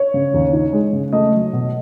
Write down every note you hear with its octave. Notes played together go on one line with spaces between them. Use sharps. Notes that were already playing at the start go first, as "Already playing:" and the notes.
Already playing: C#5
C#3
D#2
D#4
G#3
C#3
A3 D#5
F#3
B2